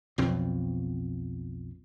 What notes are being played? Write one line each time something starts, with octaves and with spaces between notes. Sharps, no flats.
B1 F2 B2 C4